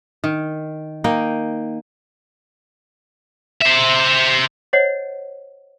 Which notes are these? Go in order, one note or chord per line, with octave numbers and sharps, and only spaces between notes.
D#3
A#3 D#4 G5
C5 E5
C5 C#5 D#5 F#5